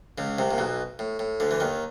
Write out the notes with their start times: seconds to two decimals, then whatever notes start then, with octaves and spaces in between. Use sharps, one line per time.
0.18 C#2 C#3
0.39 C2 C3
0.51 A#2
0.58 B1 B2
0.99 A2
1.19 A2
1.40 D2 D3
1.51 E3
1.60 D#2 D#3